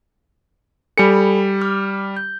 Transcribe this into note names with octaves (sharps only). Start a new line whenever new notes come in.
G3 A4 G#5 B5 C#7
D6 F6
G6